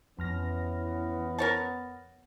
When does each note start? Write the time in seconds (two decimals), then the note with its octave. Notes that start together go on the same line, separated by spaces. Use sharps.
0.19 F2 E3 B3 C#4 F6 A#6
1.38 A#4 C#5 A5